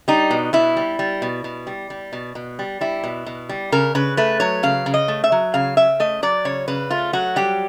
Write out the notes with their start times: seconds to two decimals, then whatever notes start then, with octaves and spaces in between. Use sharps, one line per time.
0.08 G3 D#4
0.31 B2
0.53 B2 E4
0.77 G3
0.99 G3
1.22 B2
1.44 B2
1.67 G3
1.90 G3
2.13 B2
2.35 B2
2.59 G3
2.81 G3 E4
3.04 B2
3.26 B2
3.49 G3
3.72 C#3 A#4
3.95 C#3 B4
4.17 A3 B4
4.40 F#3 C#5
4.63 C#3 F5
4.86 C#3
4.94 D#5
5.08 A3
5.24 E5
5.32 F#3
5.54 C#3 F5
5.77 C#3 E5
6.00 A3 D#5
6.23 F#3 D5
6.45 C#3 C#5
6.68 C#3 B4
6.90 A3 F4
7.13 F#3 F#4
7.36 G3 G4